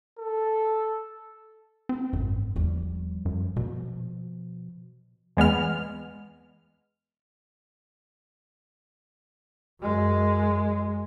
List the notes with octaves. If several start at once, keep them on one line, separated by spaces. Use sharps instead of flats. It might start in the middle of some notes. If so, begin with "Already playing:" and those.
A4
C4
G#1 F#2
E2 F3 G3
F#2
B2 F3
E2 G#3 B3 F6
F#2 G#3